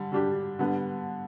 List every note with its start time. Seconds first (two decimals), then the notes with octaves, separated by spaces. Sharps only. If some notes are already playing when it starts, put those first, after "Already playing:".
Already playing: D3 G3
0.12 D3 G3 D4 G4
0.59 D3 G3 B3